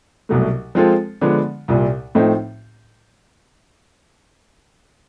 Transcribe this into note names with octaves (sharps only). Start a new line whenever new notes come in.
C2 B2 F#3 A3
F3 G#3 C4 F4 A4
D3 F3 G#3 B3
C2 A#2 G3
A2 F3 A3 C4 D#4